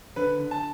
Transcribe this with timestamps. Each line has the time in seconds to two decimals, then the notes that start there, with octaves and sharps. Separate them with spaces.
0.16 D3 B4
0.39 D3
0.51 A5